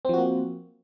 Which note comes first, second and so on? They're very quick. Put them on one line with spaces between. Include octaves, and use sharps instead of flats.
C4 F3 F#4 A#3